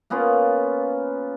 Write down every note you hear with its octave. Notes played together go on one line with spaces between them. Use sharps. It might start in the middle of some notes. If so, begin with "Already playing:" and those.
A#3 B3 C#4 F4